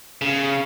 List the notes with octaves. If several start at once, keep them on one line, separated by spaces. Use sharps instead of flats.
C#3